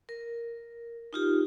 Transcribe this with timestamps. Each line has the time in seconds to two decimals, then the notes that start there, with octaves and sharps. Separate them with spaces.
0.09 A#4
1.13 D#4 F4 G4